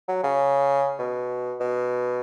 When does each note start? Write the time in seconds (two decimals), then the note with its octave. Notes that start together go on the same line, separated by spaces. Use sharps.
0.08 F#3
0.23 C#3
0.99 B2
1.60 B2